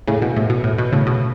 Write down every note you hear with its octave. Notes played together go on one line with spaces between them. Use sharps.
A2 C#3
B2
A2
B2
A2
B2
A2 C#3
B2